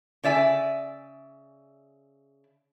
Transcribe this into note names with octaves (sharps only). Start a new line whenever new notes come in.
C#3 D5 E5 G#5